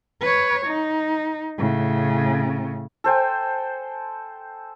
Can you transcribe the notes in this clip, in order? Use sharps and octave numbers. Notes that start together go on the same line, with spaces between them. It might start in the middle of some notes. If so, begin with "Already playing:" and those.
B4 C#5
D#4
A2 C#3
A4 C5 G5 G#5